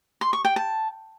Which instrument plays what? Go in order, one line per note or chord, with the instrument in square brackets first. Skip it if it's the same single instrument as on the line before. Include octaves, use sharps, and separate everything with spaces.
[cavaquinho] C6
C#6
G5
A5